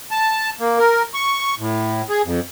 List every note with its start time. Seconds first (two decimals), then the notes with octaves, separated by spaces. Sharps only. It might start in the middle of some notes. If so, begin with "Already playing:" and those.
0.11 A5
0.60 A#3
0.79 A#4
1.14 C#6
1.59 A2
2.09 G#4
2.24 F2